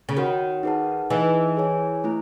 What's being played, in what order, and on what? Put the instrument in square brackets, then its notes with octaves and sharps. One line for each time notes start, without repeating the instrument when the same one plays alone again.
[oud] C#3
[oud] D#3 [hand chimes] F#4 C#5 F#5
[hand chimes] D#4 G#4 B4 F#5 A5
[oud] E3 [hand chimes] D#4 G#4 D#5 G#5
[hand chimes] G#4 C#5 G#5
A3 E4